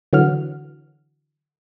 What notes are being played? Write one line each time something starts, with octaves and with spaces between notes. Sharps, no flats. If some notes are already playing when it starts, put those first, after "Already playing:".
D3 E3 F#3 F#5 F6